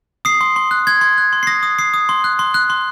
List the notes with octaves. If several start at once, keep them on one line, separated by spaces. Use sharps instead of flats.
D#6 C7
C6
C6
F#6
C6 G#6
C6
F#6
C6
C7
D#6 A#6
D#6
D#6 C7
D#6
C6
F#6
C6
F#6
C6